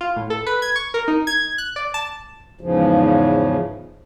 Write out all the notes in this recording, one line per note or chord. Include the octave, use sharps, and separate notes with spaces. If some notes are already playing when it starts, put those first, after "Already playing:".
F4
A2
A4
B4
G#6
C#6
A#4
D#4
G#6
F#6
D5
A5
E2 G#2 C#3 F3